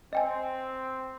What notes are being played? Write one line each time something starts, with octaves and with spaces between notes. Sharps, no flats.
C4 D#5 G5 G#5